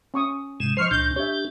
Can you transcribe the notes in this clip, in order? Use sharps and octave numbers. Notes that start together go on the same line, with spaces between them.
C#4 C#6 D#6
G#2 C3 G#3 E7
F3 C5 D#5 C#6 F6 C7
C#2 A#2 D4 G6
D4 G4 C#5 E5